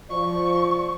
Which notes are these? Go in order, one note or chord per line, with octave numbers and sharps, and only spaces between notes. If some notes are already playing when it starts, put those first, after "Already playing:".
F3 D5 C#6